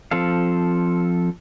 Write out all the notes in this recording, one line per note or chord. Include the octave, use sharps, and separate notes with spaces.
F3 C4 A4 F5